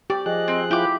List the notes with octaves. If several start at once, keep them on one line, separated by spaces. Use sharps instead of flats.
G4 D5
F3 G#4 D#5 F#6
C4
E4 F4 G4 D6